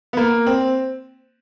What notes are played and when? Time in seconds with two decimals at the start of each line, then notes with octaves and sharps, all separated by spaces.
0.13 B3
0.17 A#3
0.46 C4